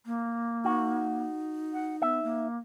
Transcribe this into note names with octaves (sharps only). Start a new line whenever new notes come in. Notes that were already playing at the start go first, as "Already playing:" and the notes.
A#3
D#4 F#4
F#5
B3 E5
A#3